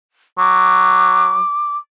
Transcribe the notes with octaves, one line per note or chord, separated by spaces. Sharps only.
F#3 D6